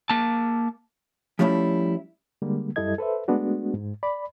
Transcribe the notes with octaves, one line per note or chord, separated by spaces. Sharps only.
A#3 A5
F3 G3 A3 C#4 E4
D3 G3 G#3 A#3
F#2 G3 E4 A4 D#5 G#6
A4 B4 C5 E5
G#3 A3 B3 D4 F#4
G#2
D5 B5